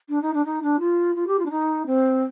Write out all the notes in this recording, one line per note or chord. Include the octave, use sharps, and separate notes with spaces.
D4
D#4
D4
D#4
D4
F4
F4
G4
F4
D4
D#4
C4